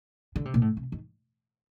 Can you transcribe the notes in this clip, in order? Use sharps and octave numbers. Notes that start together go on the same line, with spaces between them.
D3
C3
A#2
A2
C3
D#3